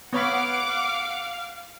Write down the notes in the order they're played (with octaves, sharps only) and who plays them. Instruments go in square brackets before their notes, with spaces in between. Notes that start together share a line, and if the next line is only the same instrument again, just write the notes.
[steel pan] B3 C#5 B5 [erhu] F5 [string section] F#5 D6